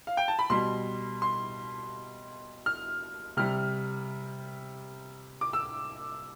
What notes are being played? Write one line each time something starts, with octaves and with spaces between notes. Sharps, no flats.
F5
G5
A5
B5
B2 G3 C6
C6
F6
C3 G3 F6
D6
E6